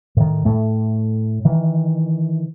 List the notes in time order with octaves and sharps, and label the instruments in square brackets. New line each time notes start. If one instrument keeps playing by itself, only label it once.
[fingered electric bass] A2 D#3
A2 A3
D#3 E3